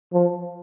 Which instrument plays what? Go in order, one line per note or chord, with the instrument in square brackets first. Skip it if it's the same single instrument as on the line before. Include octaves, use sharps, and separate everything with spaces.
[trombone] F3